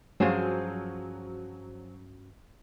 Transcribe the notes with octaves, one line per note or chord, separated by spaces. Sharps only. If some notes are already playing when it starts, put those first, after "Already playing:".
G2 F3 F#3 C#4 F#4 G#4 C5